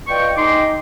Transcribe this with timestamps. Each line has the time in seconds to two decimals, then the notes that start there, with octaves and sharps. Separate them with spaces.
0.08 F4 B4 D5 D#5 G5 C#6
0.36 G#3 D#4 D#5 G5 C6 D6